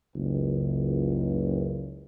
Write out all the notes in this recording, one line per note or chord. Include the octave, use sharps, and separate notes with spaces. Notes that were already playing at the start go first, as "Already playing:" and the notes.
F#1 C#2